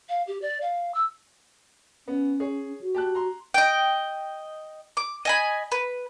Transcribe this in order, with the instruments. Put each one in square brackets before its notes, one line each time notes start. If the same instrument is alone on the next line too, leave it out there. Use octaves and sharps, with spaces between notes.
[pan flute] F5
G4
D5
F5
E6
[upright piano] B3 [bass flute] C#4
[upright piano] G#4 C#5
[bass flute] F#4
[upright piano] G4 A5 F#6
A#5 C6
[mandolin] D#5 G5
D6
D#5 G#5 B5
B4